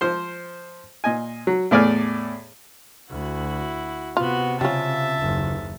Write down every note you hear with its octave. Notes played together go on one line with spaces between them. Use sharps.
F3 C5 C6
A#2 D#5 G#5
F#3
E2 A2 D5 G#5 F6
D2 E4 F#4
C3 B3 F4 F#4
C#3 G3 C#4 F4 E5 A5
F#1 D#2